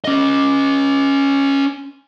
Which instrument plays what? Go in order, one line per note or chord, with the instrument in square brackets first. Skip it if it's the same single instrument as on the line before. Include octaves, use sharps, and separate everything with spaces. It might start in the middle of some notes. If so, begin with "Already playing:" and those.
[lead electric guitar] C#4 D#5